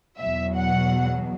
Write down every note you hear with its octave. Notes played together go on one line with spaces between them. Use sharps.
E2 B2 F#3 E5
F#5